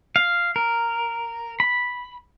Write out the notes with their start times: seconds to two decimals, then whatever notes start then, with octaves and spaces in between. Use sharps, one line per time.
0.16 F5
0.56 A#4
1.60 B5